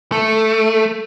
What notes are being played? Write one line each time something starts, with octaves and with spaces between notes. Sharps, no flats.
A3